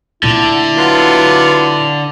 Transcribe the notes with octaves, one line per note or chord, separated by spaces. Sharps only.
A#2 D3 A3 E4
F#3 B3 F4